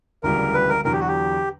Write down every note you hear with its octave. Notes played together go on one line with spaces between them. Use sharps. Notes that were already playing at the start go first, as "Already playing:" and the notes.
E1 D2 C#3 E3 G3 A#4
B4
A#4
E2 D3 F#3 A#4
G4
F#4
G4